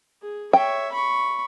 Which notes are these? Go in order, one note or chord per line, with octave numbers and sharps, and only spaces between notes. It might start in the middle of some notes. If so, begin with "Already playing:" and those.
G#4
C#5 E5 G5
B5 C#6